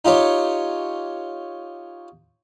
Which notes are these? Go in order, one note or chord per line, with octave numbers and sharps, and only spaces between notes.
D#4 F4 G4 C#5